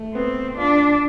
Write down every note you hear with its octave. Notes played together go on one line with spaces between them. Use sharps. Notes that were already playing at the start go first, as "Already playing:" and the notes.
Already playing: A3
B3 C4
D4 F4